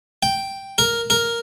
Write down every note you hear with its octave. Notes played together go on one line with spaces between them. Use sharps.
G5
A#4
A#4